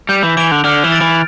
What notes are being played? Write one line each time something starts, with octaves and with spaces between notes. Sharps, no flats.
G3 G6
E3
E3 D7 F7
D3
D3 F6
E3
A6 D7
E3